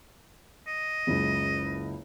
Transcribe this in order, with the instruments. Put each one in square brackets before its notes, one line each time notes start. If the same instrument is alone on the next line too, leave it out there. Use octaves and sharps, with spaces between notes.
[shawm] D#5
[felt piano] F#1 C#2